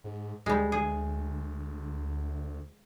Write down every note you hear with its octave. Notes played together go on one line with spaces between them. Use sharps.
G#2
D2 G3 G#3
G#4